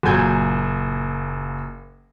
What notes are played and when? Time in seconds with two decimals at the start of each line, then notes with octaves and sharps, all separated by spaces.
0.03 F#1 A#2 F#3 G#5 G6 G#6